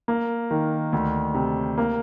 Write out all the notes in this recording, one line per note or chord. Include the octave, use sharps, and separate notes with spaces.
A#3
D#3
D2
C3
A#3